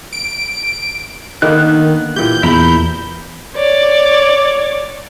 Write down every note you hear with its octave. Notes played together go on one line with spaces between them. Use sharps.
D7
D3 D#3 A#3 B3 F#6
A#2 E3 G4 G6
E2 E4 A#5 B5
C#5 D5